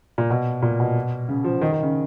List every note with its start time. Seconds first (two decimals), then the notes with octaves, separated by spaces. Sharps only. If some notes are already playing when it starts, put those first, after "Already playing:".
0.18 A#2
0.30 B2
0.62 A#2
0.80 B2
1.29 C#3
1.44 F3
1.61 D#3
1.72 D#3
1.83 C#3